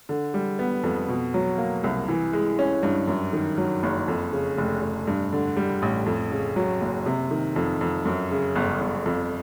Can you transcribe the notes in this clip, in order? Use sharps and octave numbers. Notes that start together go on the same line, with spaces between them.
D3
G3
B3
F2
B2
F#3
A#3
C2
E3
G#3
C#4
G2
F#2
D#3
F#3
F#1
F2
C#3
F1
F1
G2
D3
G3
A1
F2
C#3
F#3
F#1
C3
D#3
F2
F2
F#2
C#3
G1
G1
F2